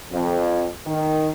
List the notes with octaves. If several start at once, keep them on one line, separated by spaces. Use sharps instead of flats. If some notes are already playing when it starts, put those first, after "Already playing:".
F2
D#3